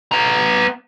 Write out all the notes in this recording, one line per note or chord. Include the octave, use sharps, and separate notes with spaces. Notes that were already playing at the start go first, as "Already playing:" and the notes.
B3 A#5